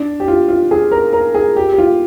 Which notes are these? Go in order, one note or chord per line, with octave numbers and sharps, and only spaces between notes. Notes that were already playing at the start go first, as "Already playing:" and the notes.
Already playing: D4
G4
F4
F4
G#4
A#4
A#4
G#4
G4
G4
F4